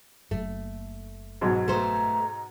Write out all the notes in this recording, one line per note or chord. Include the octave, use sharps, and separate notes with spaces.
F#1 A3
G#2 B2 F#3
A3 B3 C5 A#5